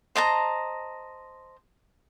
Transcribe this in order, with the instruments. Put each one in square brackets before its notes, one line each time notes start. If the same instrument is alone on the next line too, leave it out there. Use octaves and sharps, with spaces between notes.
[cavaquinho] C5 D#5 A5 A#5